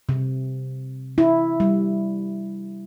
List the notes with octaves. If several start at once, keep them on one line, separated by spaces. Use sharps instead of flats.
C3
E4
G3